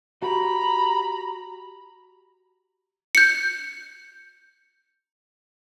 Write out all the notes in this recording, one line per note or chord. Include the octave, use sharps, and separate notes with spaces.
F#4 G4 A#5 B5
G6 C#7